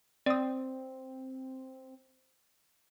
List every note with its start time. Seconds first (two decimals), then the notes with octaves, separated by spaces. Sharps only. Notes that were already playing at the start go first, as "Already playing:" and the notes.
0.26 C4 D5 D#6